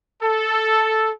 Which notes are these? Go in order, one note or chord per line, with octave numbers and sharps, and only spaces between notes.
A4